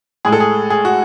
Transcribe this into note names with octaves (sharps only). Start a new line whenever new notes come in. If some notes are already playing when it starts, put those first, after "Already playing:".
A2 G#3 G#4
A4
G#4
G#4
F#4